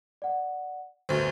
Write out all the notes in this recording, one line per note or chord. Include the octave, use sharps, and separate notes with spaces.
D5 F#5
G1 D2 F#4 C5